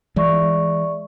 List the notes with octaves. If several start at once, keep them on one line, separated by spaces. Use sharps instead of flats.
E3 G#3 D5 E5 C#6